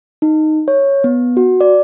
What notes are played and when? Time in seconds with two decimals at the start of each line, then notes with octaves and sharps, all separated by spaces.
0.22 D#4
0.68 C#5
1.04 B3
1.37 F#4
1.61 D5